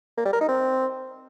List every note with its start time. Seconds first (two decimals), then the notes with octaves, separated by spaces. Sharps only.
0.18 A#3
0.25 G3
0.33 A#4
0.41 D#4
0.49 C4